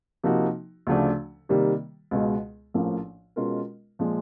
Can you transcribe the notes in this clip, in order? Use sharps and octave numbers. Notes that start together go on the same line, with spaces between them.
C3 F3 A#3 D#4 F#4
D2 C#3 F3 A3 D4
C3 D#3 G3 A#3
C#2 B2 G#3
A#1 A2 F3 A#3 C#4
B2 G#3 C#4 F4 A#4
A#2 F3 G#3